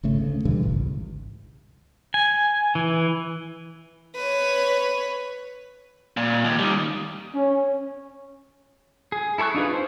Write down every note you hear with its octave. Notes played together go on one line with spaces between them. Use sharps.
G#1 C#3 A3
D2 C#3
G2 B2 D3 E3
G#1 C#2
G#5
E3
B4 C#5
A#2
D#2
D#3 G3
C#4
G#4
E4 A4 C#5 C#6 F#6
D4 D#4 F4 G#4 B4
C5